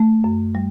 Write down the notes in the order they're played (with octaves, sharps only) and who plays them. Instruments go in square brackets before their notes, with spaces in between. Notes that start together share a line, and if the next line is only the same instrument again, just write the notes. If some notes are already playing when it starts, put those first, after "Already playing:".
Already playing: [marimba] A3
F#2
G3